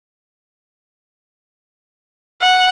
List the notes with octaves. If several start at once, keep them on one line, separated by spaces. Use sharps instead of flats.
F#5